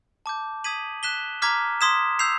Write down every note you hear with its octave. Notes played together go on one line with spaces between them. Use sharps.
A5 D6 G6
D#6 G#6 B6 D#7 F#7
F#6 B6 E7 G7
A#5 D6 F6 G#6 B6
C6 D#6 G#6 B6 E7
E6 G6 C7 F7